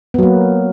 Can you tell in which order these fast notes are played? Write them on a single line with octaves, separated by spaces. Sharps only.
B3 F#3 A#3